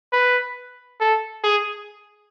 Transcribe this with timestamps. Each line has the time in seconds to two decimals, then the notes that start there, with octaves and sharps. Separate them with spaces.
0.13 B4
1.00 A4
1.44 G#4